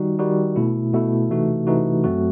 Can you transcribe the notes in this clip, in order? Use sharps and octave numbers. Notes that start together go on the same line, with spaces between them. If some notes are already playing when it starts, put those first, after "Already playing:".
Already playing: D#3 G3 D#4 F#4
D#3 G3 D#4 F#4
B2 A3 E4
B2 A3 E4
C3 E3 A3 D#4 F#4
C3 E3 A3 D#4 F#4
F#2 F#3 A3 C4 F#4